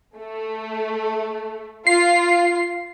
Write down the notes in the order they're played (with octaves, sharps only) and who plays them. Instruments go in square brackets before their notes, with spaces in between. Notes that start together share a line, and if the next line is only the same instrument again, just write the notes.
[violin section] A3
[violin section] F4 [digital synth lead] C7